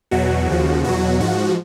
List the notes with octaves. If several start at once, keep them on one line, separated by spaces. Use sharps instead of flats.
E2 B2 F#3 F#4
D#2 C#3 F3
E2 B2 F#3 F#4
G#2 F3 F#4